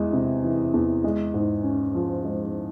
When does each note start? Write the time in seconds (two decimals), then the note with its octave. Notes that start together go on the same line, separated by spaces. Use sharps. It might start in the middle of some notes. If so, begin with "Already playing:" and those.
Already playing: E2 E3 G#3
0.13 C3
0.44 E3
0.74 E2
1.04 G#3
1.34 G#2
1.64 C#4
1.95 F3
2.25 G#3